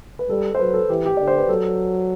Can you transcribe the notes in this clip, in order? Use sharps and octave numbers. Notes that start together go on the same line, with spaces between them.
B4
G3 A4
C5
F#3 B4
A4
E3 G4
G4
D3 D5
C5
B4
F#3 A4